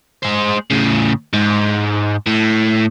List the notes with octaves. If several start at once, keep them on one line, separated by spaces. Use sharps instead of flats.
G#3 C5
A2 C#3
G#2
A2